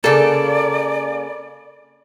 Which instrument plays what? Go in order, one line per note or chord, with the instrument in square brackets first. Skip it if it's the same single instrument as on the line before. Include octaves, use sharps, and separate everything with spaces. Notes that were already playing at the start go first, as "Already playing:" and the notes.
[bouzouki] C#3 A#3 [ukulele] A4 [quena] D5